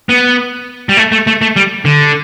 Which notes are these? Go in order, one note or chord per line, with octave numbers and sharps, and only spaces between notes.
B3
G3
A3
A3
A3
A3
G3
D3